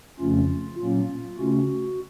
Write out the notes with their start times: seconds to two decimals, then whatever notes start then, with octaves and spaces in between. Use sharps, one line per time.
0.20 F2 C#3 F3 A3 C#4 F4
0.79 A#2 F#3 A#3 C#4 F4
1.38 C#3 A3 C#4 F#4